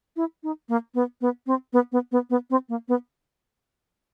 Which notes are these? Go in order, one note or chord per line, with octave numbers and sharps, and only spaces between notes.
E4
D#4
A#3
B3
B3
C4
B3
B3
B3
B3
C4
A#3
B3